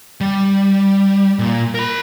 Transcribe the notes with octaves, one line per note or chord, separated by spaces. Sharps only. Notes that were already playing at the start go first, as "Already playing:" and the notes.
G3
A#2
A#4 B5